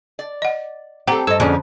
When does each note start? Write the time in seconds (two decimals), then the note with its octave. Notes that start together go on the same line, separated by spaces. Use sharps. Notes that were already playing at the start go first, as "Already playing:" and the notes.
0.19 D5
0.42 D#5 F#5
1.07 G3 C4 G4 A4 F#5 A#5
1.27 G2 A4 C5 D#5 E6
1.40 F2 B2 D3 C#4 D4 G#4